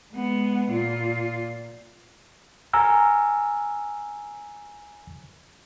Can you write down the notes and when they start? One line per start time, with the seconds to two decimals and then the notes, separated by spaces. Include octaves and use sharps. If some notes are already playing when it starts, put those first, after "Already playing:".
0.13 G#3 B3
0.70 A#2 F4
2.73 G#5 A#5 E6 F6